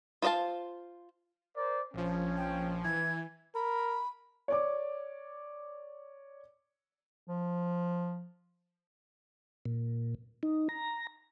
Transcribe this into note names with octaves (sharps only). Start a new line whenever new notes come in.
F4 C5 D#5 F5 A5
A#4 C5 D5
A#1 F3 C#4
G5
E3 G#6
A#4 B5
C#5 D5 D6
F3
A#2
D#4
A#5